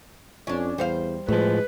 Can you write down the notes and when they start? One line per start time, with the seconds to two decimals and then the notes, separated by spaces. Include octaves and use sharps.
0.47 F2 C#4 D4
0.78 E2 G3 C5 F5
1.28 A2 F3 G#3 B4